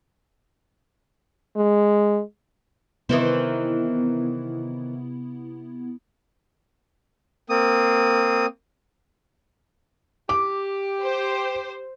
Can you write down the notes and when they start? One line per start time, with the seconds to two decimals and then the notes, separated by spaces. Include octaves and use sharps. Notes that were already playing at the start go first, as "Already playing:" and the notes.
1.56 G#3
3.09 C3 D#3 E3 B3 C4 E4
7.50 A#3 C4 D#6
10.29 G4 D6
11.02 C5